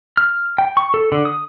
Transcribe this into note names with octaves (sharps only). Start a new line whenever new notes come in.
F6
G5
C#6
A4
D3
D#6